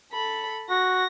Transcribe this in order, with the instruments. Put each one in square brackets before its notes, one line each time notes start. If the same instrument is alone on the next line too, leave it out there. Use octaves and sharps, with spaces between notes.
[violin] A4 B5
[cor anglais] F#4 [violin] A#6